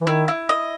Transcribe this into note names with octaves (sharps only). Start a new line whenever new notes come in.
E3
D#3 E4
E4
D#5